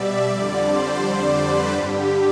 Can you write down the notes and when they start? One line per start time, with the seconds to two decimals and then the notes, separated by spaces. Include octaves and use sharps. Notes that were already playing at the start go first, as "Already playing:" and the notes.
Already playing: B2 G3 D5 E5
0.26 F2 D3 G3 D5
0.63 C5
1.36 B4
1.72 G2 D3 G3 G4